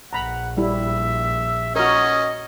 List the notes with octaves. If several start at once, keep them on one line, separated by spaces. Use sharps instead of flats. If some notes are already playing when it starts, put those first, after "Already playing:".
A#1 F#5 A#5 B5
G3 E4 E5
C#4 F#4 A#4 D#5 D#6